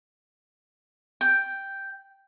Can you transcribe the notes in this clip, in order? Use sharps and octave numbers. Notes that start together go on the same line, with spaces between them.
G5